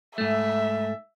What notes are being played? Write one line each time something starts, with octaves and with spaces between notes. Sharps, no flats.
G#2 A3 E5